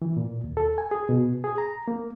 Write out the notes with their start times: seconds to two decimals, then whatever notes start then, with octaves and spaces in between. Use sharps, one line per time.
0.02 E3
0.17 A#2
0.44 D#2
0.57 A4
0.78 G#5
0.91 G#4
1.09 B2
1.44 G#4
1.58 A#5
1.88 A#3